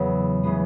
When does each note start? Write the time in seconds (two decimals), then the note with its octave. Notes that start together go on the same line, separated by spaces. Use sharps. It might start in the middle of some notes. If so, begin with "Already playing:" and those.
Already playing: E2 C#3 F#3 B3
0.43 C#3 E3 G#3 B3